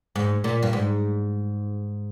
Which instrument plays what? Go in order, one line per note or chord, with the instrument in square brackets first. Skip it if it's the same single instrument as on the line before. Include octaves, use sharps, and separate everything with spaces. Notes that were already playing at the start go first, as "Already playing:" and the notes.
[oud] G#2
A#2
G2
G#2